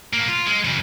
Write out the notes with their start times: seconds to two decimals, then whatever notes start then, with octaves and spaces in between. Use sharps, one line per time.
0.13 A2 A#3
0.28 F4
0.47 G#3
0.65 F#2 C#3